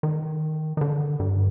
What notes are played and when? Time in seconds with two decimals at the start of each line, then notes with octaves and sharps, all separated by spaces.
0.03 D#3
0.77 D#3
0.81 D3
1.20 G2